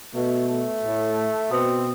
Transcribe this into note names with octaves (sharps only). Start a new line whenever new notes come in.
B2 A3
A3
A2
B2 C4